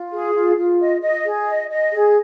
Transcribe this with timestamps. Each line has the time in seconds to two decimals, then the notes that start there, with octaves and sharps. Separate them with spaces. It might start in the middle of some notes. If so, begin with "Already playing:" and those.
Already playing: F4
0.11 G#4
0.34 F4
0.56 F4
0.79 D#5
1.01 D#5
1.24 G#4
1.47 D#5
1.70 D#5
1.93 G#4